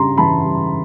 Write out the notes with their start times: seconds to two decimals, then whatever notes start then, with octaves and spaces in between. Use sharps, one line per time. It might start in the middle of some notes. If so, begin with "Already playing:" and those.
Already playing: C#3 G3 A#5 C6
0.18 E3 A5 B5
0.44 G3